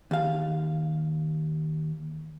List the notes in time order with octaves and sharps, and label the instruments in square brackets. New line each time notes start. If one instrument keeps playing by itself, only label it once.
[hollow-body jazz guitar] D#2 F5